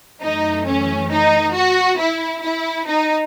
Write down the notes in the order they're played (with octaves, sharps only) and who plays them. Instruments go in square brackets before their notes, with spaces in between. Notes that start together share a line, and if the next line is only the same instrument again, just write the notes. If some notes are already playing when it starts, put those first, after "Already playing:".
[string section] F#2 E3 A3 D#4
C#4
D#4
F#4
E4
E4
D#4